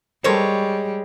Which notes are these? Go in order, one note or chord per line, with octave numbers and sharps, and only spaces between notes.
G3 G#3 A4 A#4 C5 C#5